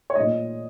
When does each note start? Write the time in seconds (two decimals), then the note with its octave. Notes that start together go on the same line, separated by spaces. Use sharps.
0.10 C#5
0.15 A#2 A3 D#5